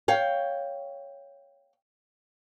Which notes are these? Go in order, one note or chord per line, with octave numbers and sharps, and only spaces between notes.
C#5 F5 G5